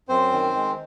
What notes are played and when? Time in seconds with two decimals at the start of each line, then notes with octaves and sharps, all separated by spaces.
0.09 F#2 C4 C5
0.32 D#3
0.55 G#3